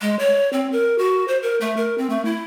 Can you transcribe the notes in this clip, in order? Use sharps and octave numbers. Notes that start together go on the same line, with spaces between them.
G#3
C#5
C4
A#4
F#4
C5
A#4
A3
A#4
C4
A3
E4